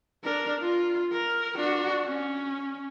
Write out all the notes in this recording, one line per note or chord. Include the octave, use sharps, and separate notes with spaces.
D4 A#4
F4
A#4
D4 F#4
C#4